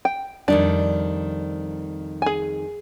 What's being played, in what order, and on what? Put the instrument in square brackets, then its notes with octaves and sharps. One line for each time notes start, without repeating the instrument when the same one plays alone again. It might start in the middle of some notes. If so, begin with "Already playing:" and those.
[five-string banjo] G5
[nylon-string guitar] F2 D#3 G3 [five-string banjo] D4
[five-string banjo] G#4 G#5